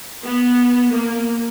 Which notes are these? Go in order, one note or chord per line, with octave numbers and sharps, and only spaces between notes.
B3
A#3